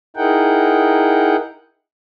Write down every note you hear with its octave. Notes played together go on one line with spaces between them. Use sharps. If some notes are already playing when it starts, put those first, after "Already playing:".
D#4 E4 G#4 A#4 F#5 G5